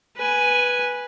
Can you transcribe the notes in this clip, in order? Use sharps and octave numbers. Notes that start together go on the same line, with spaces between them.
B4 G#5